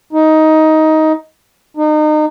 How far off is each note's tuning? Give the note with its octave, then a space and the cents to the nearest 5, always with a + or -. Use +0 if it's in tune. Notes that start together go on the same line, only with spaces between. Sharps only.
D#4 +15
D#4 -30